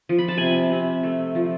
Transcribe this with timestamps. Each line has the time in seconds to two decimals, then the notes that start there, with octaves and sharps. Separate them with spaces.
0.09 F3
0.18 B5
0.28 A5
0.38 C3 G#5 B5
0.72 C3
1.03 A3
1.35 F3